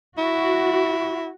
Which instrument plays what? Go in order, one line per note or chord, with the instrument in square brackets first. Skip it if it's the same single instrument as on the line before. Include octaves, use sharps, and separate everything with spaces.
[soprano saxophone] E4 [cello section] F#4